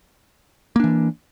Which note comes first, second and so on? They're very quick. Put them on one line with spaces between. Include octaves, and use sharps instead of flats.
A#3 D4 E3